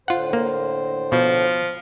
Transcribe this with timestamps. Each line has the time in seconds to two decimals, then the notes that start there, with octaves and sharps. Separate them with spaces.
0.08 A2 D3 F4 C5 F#5
0.33 A#3
1.12 B2 F3